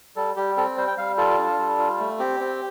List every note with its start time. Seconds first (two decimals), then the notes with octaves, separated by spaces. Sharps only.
0.16 G3 A4
0.36 G3 G4
0.57 C4 A4
0.77 G3 C5
0.87 G5
0.98 G3 F5
1.17 F4 A4
1.38 D4
1.58 G3
1.79 F4
1.99 A3
2.19 C4 G4
2.40 C4